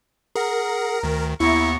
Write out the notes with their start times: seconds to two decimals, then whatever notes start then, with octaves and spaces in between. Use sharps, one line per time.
0.35 G#4 A#4 F#5
1.03 D2 D#3
1.40 D#2 B3 E4 A#5 C#6